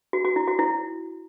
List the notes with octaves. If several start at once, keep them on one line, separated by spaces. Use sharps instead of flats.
F#4
F#4
E4
F#4
E4